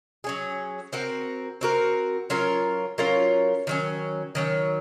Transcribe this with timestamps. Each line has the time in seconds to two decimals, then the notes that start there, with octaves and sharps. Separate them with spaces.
0.24 F#3 C#4 G#4
0.93 C4 F#4 A#4
1.61 C4 F#4 A#4
2.30 F#3 C#4 F4 A#4
2.98 F#3 C#4 F4 A#4
3.67 D#3 F#3 C#4
4.35 D#3 F#3 C#4